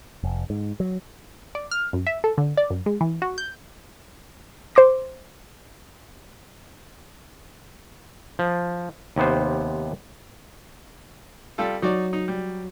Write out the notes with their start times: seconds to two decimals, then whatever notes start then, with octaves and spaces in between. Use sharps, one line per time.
0.23 F1
0.50 G#2
0.80 F#3
1.55 D5
1.71 F6
1.93 F#2
2.07 E5
2.24 A4
2.38 D3
2.57 D5
2.70 F#2
2.86 G#3
3.01 E3
3.22 F#4
3.38 G6
4.75 C5 C6 D6 A#6
8.39 F3
9.16 D#2 C3 B3 C5
11.58 G3 F4 A4
11.82 F#3 D#4 F#4 D5
12.13 D#4
12.28 G3